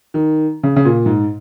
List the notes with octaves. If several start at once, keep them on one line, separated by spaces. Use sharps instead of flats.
D#3
C#3
C#3
A#2
G#2